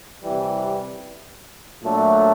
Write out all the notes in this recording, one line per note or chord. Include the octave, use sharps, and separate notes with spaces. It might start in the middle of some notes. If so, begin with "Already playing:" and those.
C3 E3 G3
A#2 F#3 A3 D4